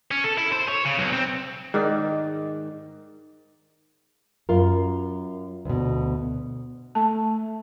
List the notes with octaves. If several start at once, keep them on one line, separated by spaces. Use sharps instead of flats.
C#4
A4
E4
C5
C#5
C#3
B1
C4
G#2 D#3 D5
F#2 F4 A#4
D2 B2
A3 A5